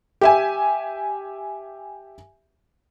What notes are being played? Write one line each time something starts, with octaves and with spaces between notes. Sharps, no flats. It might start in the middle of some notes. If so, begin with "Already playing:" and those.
G4 E5 G#5